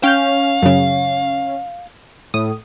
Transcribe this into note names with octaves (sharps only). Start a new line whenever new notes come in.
C#4 F5 G5 F6 G6
F#2 C#3
A2 D#6